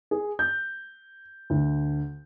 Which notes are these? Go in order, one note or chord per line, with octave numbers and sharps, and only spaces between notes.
G#4
G6
D2